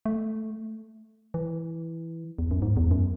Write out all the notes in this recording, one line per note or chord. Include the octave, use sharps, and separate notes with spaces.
A3
E3
E2
F#2
G#2
E2
F#2